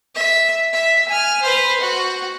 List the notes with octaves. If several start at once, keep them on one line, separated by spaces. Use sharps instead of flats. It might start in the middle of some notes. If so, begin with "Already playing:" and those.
E5
E5
G#5 F6
B4 C5
F#4